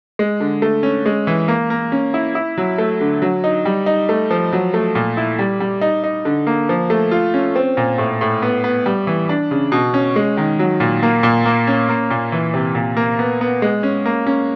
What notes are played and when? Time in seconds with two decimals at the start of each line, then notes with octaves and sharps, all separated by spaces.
0.19 G#3
0.40 D3
0.62 A3
0.83 C#4
1.06 G#3
1.27 E3
1.48 A#3
1.70 A#3
1.92 C#4
2.14 E4
2.35 E4
2.58 F#3
2.78 A3
3.01 D3
3.22 F#3
3.44 D#4
3.65 G3
3.86 D#4
4.09 A3
4.30 F3
4.53 F#3
4.74 A3
4.95 A#2
5.17 E4
5.39 G3
5.60 G3
5.81 D#4
6.04 D#4
6.25 D3
6.47 A#3
6.69 F3
6.90 A3
7.11 F4
7.34 C#4
7.56 C4
7.77 A#2
7.98 A2
8.21 A2
8.42 B3
8.64 B3
8.86 G3
9.07 E3
9.29 D4
9.51 C#3
9.72 B2
9.94 C#4
10.16 G#3
10.37 D#3
10.59 F#3
10.80 A#2
11.03 A#3
11.23 A#2
11.45 A#3
11.67 C#4
11.89 A#3
12.10 A#2
12.32 E3
12.54 C3
12.75 A#2
12.97 A#3
13.19 B3
13.41 B3
13.62 G#3
13.83 C#4
14.05 A#3
14.26 C#4